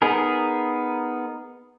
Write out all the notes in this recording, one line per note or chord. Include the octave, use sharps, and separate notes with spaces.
B3 D#4 G#4 A#4